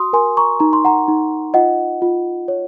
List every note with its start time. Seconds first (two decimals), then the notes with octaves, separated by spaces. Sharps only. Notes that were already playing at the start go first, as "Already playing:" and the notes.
Already playing: F#4 C6 D#6
0.13 A#4 G#5 C6
0.37 A#5 C#6
0.60 D#4 A#5
0.73 C6
0.85 F#5 A#5
1.08 D#4
1.54 F4 D#5 F#5
2.02 F4
2.48 C#5